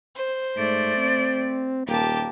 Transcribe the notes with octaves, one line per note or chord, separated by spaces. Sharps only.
C5
G#2 A3 D5
C4
D#1 A#3 G4 A5